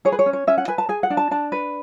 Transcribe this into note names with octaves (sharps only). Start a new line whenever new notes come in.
G#4 C#5
B4
C#5
C#4
C#5
C#4 E5
F#5
B4 G#5
A5
G#4 G#5
F#5
D4
A5
D4 A5
B4